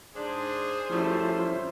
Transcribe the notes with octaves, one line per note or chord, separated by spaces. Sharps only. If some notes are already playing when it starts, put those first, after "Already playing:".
G#2 D4 G#4 C5
F#2 F3 G3 A3 C#4 E4